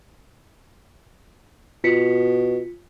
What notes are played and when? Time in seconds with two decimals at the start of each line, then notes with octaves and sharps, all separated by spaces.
1.84 B2 F4 B6 C#7